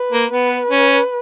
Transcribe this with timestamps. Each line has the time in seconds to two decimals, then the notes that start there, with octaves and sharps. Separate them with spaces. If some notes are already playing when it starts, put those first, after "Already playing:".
Already playing: B4
0.12 A#3
0.31 B3 B4
0.71 C#4